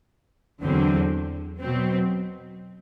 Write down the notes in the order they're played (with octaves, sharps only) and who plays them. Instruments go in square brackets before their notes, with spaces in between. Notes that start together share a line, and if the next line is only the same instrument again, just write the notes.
[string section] E2 D3 F#3 C4
B2 F#3 C4